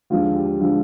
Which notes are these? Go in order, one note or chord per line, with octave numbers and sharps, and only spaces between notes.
D#2 D3 F3 G#3 F4
G4
D3 F3 G#3